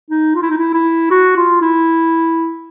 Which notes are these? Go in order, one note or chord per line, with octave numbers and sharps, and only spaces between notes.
D#4
F4
E4
D#4
E4
E4
F#4
F4
E4